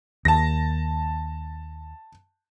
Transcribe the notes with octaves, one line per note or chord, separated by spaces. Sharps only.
D#2 A5 A#6